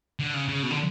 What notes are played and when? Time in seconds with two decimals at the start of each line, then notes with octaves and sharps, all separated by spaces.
0.20 D3
0.34 C#3
0.49 C#3
0.63 B2
0.71 D3